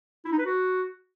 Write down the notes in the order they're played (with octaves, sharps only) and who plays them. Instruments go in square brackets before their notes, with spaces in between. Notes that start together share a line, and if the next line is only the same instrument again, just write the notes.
[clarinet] E4
D#4
B4
F#4